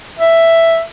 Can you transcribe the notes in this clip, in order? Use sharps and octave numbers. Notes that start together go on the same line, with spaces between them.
E5